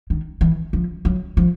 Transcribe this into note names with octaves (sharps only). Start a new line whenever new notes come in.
D#3
E3
F3
F#3
F3